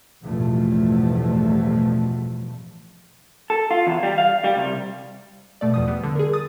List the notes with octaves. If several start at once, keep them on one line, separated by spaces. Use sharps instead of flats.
A1 E2 G2 B2 F3 A3
A4
F4
E2
G3
F5
G3
C2
B2 A3 D5
E2 F3 D#6
G3 B3
D3
G#4 A#4
D#6 A6